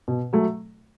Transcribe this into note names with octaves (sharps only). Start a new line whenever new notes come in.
B2
F#3 A3